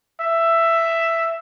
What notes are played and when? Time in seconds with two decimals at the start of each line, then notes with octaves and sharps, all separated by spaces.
0.20 E5